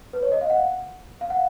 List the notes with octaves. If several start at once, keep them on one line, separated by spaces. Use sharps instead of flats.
B4
C#5
D#5
F5
F#5
F5
F#5